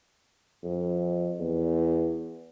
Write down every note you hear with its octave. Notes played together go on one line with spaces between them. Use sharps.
F2
E2